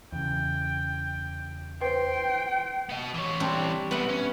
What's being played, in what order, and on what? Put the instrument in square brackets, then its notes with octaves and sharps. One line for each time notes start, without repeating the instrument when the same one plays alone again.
[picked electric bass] E2 C#3 [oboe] G5
[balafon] B4 C5 [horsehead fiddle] G5 [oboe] C6
[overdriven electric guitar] B3 D#5
E3 C#5
[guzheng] G3 C4 D4
[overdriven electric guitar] G3 E4 [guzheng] B3 F#5
[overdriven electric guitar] C#4